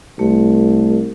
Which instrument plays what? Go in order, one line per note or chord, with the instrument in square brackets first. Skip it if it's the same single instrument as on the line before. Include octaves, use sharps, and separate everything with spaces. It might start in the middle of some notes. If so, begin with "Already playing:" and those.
[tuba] C2 [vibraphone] A3